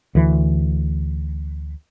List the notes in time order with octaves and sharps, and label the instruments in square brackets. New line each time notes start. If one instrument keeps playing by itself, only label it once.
[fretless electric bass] D2 E3